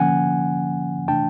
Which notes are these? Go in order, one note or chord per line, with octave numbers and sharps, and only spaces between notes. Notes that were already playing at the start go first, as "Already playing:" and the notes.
Already playing: D3 F3 A#3 C#4 F#5 G#5
C3 E3 A3 D4 G5 A5